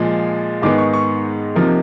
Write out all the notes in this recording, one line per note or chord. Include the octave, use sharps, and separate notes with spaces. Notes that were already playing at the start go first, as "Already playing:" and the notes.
Already playing: A#2 F3 G#3
G#2 D#3 G#3 B3 D6
C#6
C#6
C3 F3 A#3 D#4